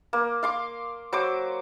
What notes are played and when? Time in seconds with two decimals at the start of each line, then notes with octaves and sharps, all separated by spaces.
0.13 A#3
0.43 F5 C6 D6
1.13 F#3 C5 D6